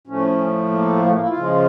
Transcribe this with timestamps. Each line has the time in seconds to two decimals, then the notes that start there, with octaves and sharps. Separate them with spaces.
0.07 A2 F3 A3 C#4
0.72 A#3
1.04 A3
1.13 A#3
1.20 E4
1.29 F4
1.36 C#3 F3 G#3